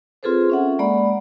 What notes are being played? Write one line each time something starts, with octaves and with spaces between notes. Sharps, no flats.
C4 F4 G#4 A4 B4 C5
C#4 E5 F#5
G#3 A#3 D5 F#5 B5